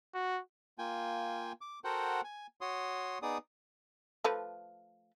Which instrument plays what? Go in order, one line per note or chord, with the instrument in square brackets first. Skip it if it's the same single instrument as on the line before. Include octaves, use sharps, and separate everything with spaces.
[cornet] F#4
[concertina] A#3 F4 G5 G#5
D6
F#4 A4 A#4 C5 F#5 G5
G#5
F#4 C#5 C6 D#6
B3 D#4 G#4 D5 D#6
[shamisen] F3 A3 B4